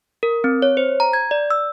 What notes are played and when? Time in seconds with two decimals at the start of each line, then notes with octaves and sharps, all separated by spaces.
0.23 A#4
0.44 C4
0.62 C#5
0.77 C5
1.00 A#5
1.13 G#6
1.31 D5
1.50 E6